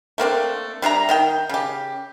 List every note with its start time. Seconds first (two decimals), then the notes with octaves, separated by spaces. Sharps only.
0.18 A3 A#3 C4 D4
0.82 G3 D4 E5 A#5
1.09 D#3 D#4 G5
1.49 C#3 G4